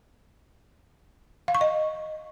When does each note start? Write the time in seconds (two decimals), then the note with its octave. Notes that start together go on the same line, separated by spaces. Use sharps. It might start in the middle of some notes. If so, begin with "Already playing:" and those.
1.48 F5
1.55 C#6
1.61 D#5